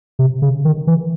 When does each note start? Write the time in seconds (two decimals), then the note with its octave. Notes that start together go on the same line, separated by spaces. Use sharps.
0.19 C3
0.42 C#3
0.65 D#3
0.87 E3